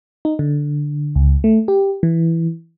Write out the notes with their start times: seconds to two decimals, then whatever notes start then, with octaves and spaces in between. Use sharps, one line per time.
0.25 D#4
0.39 D3
1.16 C#2
1.44 A3
1.68 G4
2.03 E3